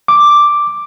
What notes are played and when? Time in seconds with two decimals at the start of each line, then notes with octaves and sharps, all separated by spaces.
0.08 D6